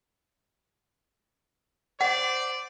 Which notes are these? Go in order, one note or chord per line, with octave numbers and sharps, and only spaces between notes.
C5 D5 F#5